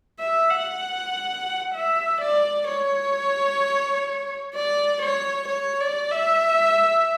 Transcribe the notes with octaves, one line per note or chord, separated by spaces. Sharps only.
E5
F#5
E5
D5
C#5
D5
C#5
C#5
D5
E5